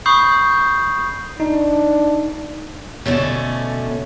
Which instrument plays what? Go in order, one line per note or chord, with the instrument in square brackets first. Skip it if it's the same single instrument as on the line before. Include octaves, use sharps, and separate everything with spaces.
[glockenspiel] B5 C#6 D#6 G6 C7
[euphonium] D4 [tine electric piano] D#4
[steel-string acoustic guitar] B2 D3 A3 C#4